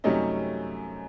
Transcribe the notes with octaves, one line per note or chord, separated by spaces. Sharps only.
F#2 C3 G3 A3 C#4 D#4